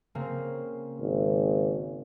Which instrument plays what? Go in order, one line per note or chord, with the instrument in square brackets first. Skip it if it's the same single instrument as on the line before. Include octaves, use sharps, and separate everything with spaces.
[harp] C#3 A#3 C4
[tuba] G#1